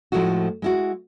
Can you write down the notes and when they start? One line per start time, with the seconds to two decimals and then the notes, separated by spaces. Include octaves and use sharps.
0.12 A2 F3 G#3 A3 E4 F#4
0.62 G#3 E4 F#4